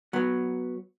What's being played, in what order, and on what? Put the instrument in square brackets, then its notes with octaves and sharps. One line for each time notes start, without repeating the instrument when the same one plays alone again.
[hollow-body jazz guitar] F#3 B3